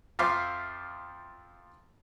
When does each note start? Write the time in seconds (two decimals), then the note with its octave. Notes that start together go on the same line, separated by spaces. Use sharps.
0.19 F2 F4 C5 E5 F5 D6